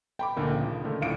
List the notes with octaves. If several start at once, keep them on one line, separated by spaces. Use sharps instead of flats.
G5 B5 D6
D2 A#2 D3 D#4 A#4
C#3 F3
D3 D#3 A3
D2 A2 F3 D5 F5 D7